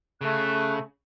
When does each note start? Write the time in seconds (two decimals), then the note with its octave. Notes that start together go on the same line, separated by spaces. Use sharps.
0.21 C#3 A3 F#6